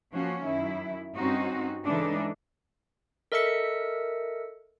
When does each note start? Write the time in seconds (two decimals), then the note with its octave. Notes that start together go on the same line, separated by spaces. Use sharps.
0.13 F3 A#3 C#4 F#4
0.43 F#2 D#3 E4
1.15 G2 C4 C#4 D#4 F#4
1.84 C#3 E3 G#3 D4 D#4 A4
3.32 A4 A#4 D#5 E5 E6 C#7